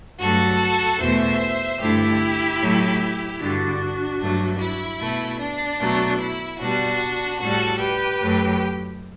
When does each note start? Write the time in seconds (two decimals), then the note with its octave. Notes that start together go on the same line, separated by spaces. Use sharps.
0.20 G2 F#3 A3 F#4 A4
1.00 E2 B2 A3 C5 E5
1.80 G2 D3 A3 E4 G4
2.60 A2 F#3 A3
3.40 G2 D3 G3 D4 F#4
4.21 G2 F#3 A3
4.60 E4
5.01 B2 A3
5.41 D4
5.81 B2 F#3 A3
6.20 E4
6.60 B2 G3 D4 F#4
7.40 A2 G3 F#4 A4
7.81 G4 B4
8.21 F#2 F#3 A3